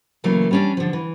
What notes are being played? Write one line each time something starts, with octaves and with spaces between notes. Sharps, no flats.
C#3 E3 F#3 A3 A#3
G3 C#4 D4
D3 F3
E3